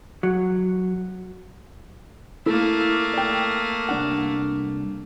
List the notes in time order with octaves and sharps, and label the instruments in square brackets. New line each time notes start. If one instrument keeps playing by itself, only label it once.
[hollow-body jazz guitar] F#3
[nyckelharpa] A3 A#3 [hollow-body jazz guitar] E4 A4
[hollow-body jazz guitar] D5 G5
C2 D4 F#5